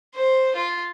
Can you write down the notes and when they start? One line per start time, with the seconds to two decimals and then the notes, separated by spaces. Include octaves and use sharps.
0.16 C5
0.55 F4